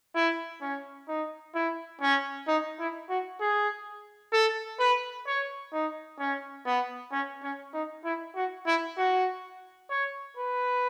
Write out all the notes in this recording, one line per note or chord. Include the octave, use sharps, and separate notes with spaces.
E4
C#4
D#4
E4
C#4
D#4
E4
F#4
G#4
A4
B4
C#5
D#4
C#4
B3
C#4
C#4
D#4
E4
F#4
E4
F#4
C#5
B4